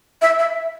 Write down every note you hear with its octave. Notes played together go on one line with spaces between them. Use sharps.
E5
E5